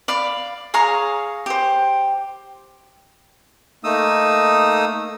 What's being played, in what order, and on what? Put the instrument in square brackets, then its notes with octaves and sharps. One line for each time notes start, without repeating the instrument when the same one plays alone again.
[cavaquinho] D5 F5 B5
G#4 C#5 F5 A#5
G4 C5
[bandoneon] A3 A#3 D#4 D#6 E6